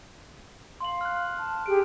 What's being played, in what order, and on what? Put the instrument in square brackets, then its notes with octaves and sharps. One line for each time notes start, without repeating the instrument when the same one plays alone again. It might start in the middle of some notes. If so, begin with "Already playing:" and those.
[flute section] F5 [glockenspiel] C6 F#7
[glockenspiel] F6 F#6
[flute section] A5
[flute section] G4 G#4 [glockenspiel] D7